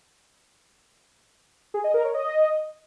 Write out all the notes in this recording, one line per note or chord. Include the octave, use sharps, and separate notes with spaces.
G#4
D#5
A#4
C#5
D#5